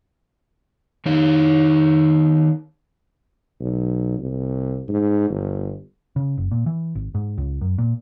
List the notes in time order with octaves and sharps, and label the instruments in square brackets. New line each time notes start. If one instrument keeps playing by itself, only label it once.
[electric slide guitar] D#3 D#4 C#5
[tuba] B1
C2
G#2
G1
[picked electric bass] C#3
F#1
A#2
E3
G#1
G#2
C#2
F#2
A#2